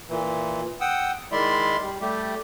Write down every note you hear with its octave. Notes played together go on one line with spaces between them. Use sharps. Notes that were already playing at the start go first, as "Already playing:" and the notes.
A#2 E3
F#5 G5 D#6 E6
D#3 G#3 E4 D5 E5 C6
G3
G3 A3 G4